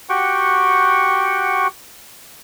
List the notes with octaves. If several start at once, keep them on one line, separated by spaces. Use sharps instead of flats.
F#4 G4 F#5 G5 C#6